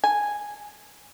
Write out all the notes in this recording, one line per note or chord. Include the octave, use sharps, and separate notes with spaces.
G#5